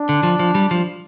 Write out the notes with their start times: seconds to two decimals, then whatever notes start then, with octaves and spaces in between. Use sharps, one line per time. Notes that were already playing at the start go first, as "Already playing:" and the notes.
Already playing: D4
0.09 D3
0.23 F3
0.39 F3
0.55 G3
0.71 F3